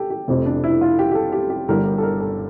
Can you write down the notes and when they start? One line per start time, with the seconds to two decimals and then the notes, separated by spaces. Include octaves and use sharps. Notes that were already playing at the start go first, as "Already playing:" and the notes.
Already playing: G4 A4
0.10 G4
0.28 F1 F2 C3 C4
0.46 D4
0.64 E4
0.81 F4
0.99 G4
1.12 G4
1.15 A4
1.32 G4
1.50 G4
1.68 G1 G2 D3 G3 A#4
1.85 A#4
1.98 A4
2.03 A#4
2.21 A4